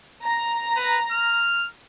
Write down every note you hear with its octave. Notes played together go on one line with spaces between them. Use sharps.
A#5
B4
F6